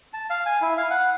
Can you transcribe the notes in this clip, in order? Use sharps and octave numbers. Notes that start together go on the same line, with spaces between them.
A5
F5
G#5
E4
F5
F#5